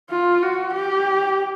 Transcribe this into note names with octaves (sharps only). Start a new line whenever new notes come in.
F4
F#4
G4